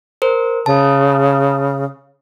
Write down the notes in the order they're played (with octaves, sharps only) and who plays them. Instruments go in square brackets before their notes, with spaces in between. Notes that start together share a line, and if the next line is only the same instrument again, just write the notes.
[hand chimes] A#4 C5
[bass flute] C#3 [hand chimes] A5